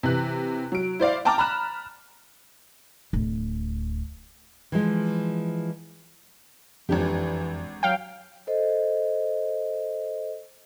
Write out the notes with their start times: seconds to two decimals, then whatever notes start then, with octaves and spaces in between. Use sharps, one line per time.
0.03 C3 E3 F#6
0.72 F#3 D7
1.00 E4 C5 D5 F5
1.25 G5 A5 A#5 D6 F6 A6
1.38 A#5 B5 F6 F#6 E7
3.13 D1
4.72 E3 F3 G#3
6.89 G#1 F2 E3 D4 G4
7.83 F#3 F5 G5
8.47 A4 C5 D#5